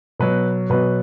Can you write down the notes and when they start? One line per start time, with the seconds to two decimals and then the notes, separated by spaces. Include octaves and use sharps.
0.19 B2 F#3 B4
0.70 B2 F#3 B4